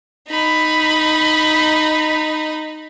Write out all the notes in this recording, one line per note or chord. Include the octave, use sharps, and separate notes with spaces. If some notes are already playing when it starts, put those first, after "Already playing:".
D#4 B5